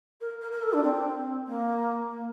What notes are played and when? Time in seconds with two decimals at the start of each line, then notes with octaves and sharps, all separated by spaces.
0.21 A#4
0.41 A#4
0.52 A#4
0.62 A4
0.73 D4
0.83 C4
1.46 A#3
2.09 A#3